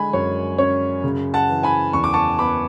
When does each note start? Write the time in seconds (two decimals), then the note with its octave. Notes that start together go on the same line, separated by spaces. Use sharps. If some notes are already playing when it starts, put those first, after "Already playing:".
Already playing: D3 G#3 G#5 B5
0.13 F#2 C#5
0.58 C#4 C#5
1.04 C#3
1.34 F#5 A5
1.49 E3
1.63 G#5 B5
1.93 E2 C#6
2.04 D6
2.14 A5 C#6
2.39 B3 B5 D6